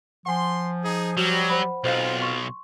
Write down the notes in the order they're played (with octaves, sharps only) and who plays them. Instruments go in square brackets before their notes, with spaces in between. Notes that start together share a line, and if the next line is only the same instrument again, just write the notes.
[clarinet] F3 [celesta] F#5 G#5 [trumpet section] C6
[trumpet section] D#4 G#4
[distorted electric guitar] F#3 [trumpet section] G3 [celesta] F#4 E7
[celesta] C5 F#5 B5
[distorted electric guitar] B1 [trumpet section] C4 F4 [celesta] C5 D#5 F5
[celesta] C6 C#6